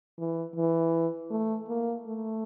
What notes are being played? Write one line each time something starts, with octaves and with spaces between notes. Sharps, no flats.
E3
E3
A3
A#3
A3